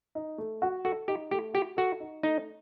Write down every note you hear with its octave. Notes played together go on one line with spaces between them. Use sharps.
D#4
A3
F#4
F#4 A4
D#4 G4
A3 G4
F#4 G4
F#4 A4
D#4
A3 D#4